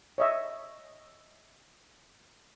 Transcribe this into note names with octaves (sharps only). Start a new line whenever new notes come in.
C#5 D#5 E5